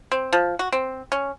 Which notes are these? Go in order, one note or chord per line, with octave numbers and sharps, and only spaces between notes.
C4
F3
F#4
C4
C#4